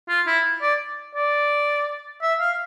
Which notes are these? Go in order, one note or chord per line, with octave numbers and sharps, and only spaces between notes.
F4
E4
D5
D5
E5
F5